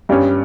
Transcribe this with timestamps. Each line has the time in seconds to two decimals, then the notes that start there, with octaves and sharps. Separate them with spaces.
0.09 G2 G3 C#4